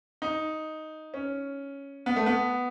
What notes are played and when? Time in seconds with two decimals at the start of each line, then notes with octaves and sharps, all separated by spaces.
0.22 D#4
1.14 C#4
2.06 B3
2.16 A3
2.26 B3